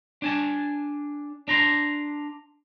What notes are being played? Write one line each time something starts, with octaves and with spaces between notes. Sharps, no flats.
D4 G#5 A5
D4 A#5 C6